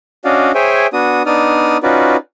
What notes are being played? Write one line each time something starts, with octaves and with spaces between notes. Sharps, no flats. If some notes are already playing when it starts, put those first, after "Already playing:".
C#4 D4 F#4 D5 D#5 F5
G#4 C5 C#5 E5 G5 G#5
B3 D4 F#4 D#6
B3 D4 D#4 D5 D#6 F6
C#4 D#4 F4 F#4 B4 D5